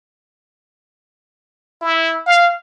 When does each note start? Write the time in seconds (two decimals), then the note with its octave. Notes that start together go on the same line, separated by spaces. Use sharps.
1.82 E4
2.27 F5